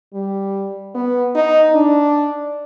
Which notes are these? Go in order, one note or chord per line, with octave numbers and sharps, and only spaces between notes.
G3
B3
D#4
D4